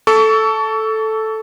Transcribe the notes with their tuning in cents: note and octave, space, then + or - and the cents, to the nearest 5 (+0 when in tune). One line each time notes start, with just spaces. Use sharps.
A4 -5 C#6 +35